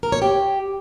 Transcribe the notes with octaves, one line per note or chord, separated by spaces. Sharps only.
A#4
C#5
G4